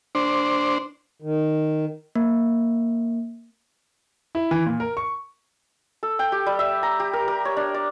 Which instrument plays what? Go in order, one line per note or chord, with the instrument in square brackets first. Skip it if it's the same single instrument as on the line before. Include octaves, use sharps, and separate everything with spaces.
[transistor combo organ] D4 C5
[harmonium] D#3
[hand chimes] A#3
[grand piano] E4
E3
A#2
A#4
C#6
[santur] A4
G5
G4
G3
E5
A#5
G4
A#4
A#4
C#5
D4
D5